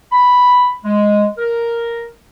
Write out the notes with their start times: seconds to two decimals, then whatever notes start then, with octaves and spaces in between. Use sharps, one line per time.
0.12 B5
0.85 G#3
1.38 A#4